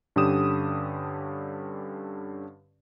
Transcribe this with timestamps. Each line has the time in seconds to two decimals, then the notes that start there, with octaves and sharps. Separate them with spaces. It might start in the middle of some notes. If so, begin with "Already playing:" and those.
0.16 G2 D3 C#4 G4 D#6 E7